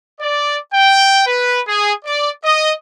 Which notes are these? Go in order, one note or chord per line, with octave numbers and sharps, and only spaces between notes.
D5
G5
B4
G#4
D5
D#5